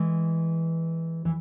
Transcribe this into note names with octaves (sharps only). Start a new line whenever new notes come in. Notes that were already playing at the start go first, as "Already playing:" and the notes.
Already playing: E3 G#3
E3